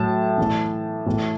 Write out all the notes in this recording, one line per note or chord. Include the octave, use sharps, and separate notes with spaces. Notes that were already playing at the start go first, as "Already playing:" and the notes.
Already playing: A2 F#3 A5
A2 E3
A2 E3